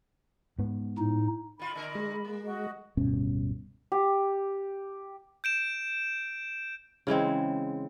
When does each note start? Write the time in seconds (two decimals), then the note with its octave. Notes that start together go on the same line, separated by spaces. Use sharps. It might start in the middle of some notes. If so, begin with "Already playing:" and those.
0.59 G#2 B3
0.98 A2 D#4
1.59 D#3 F4 B5
1.74 A#2 D3 A#4
1.95 G#3
2.24 A#3
2.44 F#4 D#5
2.97 D1 G2 B2 C#4
3.92 G4
5.44 G6 D7 E7
7.07 C#3 E3 G#3 C4